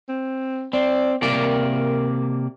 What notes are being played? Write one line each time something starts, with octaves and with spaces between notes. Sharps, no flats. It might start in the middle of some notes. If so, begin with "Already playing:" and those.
C4
C4 D5
C3 A#3 A#4 D5